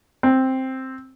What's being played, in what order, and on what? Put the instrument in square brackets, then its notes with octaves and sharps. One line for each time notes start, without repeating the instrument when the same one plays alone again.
[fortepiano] C4